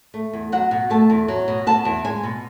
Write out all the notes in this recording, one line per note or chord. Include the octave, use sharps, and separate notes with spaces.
A3
E2
F#3 F#5
B2
A3 A5
E2
F#3
B2
B3 A5
E2
G#3 G#5
B2